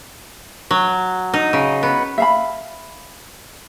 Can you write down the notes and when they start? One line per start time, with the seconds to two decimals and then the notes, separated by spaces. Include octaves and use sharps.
0.71 F#3
1.33 D#4
1.53 C#3
1.83 B3
2.18 E5 F5 B5